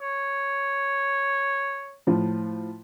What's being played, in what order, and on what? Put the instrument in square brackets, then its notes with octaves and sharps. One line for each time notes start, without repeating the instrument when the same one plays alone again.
[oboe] C#5
[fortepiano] A2 F3